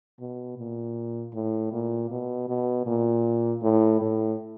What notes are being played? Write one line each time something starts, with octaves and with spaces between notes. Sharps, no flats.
B2
A#2
A2
A#2
B2
B2
A#2
A2
A2